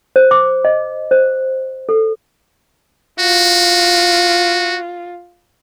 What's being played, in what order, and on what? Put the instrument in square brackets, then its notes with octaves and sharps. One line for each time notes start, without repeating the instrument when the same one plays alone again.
[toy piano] C5
D6
D#5
C5
A4
[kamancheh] F4 [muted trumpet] F#4